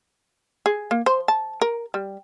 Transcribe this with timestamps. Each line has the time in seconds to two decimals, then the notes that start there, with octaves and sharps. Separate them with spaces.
0.66 G#4
0.91 A#3
1.06 C5
1.28 A5
1.61 A#4
1.94 G3